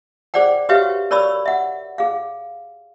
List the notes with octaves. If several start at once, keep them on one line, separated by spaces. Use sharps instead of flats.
G#4 C5 D5 F#5 G5
F#4 G4 B4 C#5 E5 F5
A#4 C#5 D5 B5 C#6 E6
E5 F#5
G#4 F5